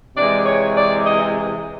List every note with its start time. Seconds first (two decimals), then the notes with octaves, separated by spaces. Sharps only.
0.16 C3 E3 G#3 D5
0.46 C#5
0.76 D5
1.07 D#5